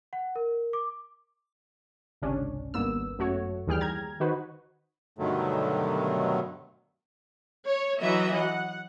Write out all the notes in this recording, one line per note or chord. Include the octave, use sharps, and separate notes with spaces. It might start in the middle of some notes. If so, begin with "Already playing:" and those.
F#5
A#4
D6
G#1 C#2 C3 C#4 D4
G#1 G2 A#3 B3 E6
F#2 A3 F#4 C#5
D#2 E3 G3 G#4 G5 F6
A#5 G#6
D#3 D#4 F#4 B4 C5
G2 B2 D3 D#3 F#3 A3
C#5
E3 F#3 D#5 E5
F#5